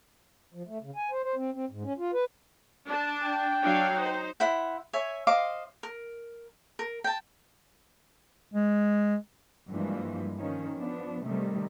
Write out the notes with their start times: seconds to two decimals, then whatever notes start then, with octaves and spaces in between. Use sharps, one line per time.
0.54 F3
0.67 A3
0.82 C#3
0.96 G#5
1.11 C5
1.23 C5
1.36 C4
1.54 C4
1.70 G#2
1.84 C#4
1.98 F4
2.13 B4
2.88 D4 A5
3.23 G5
3.63 F#3 D4 F5
3.95 D#4 C5
4.40 E4 C5 F#5
4.93 C#5 E5 G#5
5.27 C5 D#5 F5 D6
5.83 A#4
6.79 A#4
7.04 G5 A5
8.54 G#3
9.70 G2 E3 F3 G3 G#3 A#3
10.38 D#3 F3 C#4
10.76 F3 B3 D4
11.25 C3 D#3 G3 A3